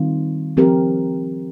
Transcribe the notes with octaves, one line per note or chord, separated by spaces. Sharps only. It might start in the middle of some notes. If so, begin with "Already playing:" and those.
Already playing: D#3 G3 C4 F4
F3 C4 G4 A#4